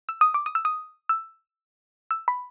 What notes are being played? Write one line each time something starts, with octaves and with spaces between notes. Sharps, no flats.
E6
D#6
D6
D#6
E6
D#6
E6
E6
B5